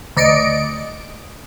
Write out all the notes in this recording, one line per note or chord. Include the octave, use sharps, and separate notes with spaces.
D2 D5 D#5 C#7 D7